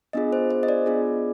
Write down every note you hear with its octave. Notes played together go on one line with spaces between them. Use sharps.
B3 D4 F4 G#4 D#5
C5
C5
D#5
D5
B3 D4 F4 G#4